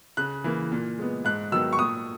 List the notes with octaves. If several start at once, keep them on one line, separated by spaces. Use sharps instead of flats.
C#3 F#6
E3 A#3
A#2
G#3 B3
G#2 F#6
D#3 F#3 B3 E6
C#6
A#2 D#6